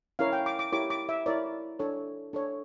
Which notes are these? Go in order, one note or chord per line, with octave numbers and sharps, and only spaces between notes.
C#4 E4 A#4 C#5 F5
G5
D6
D6
E4 G4 A#4 C#5 D6
D6
E5
E4 A#4 C#5 D5
D4 A4 C#5
D4 A4 C#5